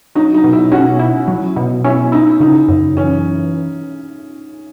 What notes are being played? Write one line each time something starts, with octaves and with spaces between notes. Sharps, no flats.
F#3 D#4
D#4
B2
E4
C#4 F#4
E4
F#3
B2
C#4 E4
D#4 E4
C#3 D#4
F#2
E3 C#4